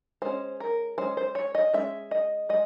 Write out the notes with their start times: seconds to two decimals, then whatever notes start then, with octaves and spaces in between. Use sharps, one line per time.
0.22 G#3 C#4 C5
0.60 A#4
0.98 G#3 C#4 C5
1.17 C5
1.35 C#5
1.55 D#5
1.73 G#3 C#4 E5
2.11 D#5
2.49 G#3 D#5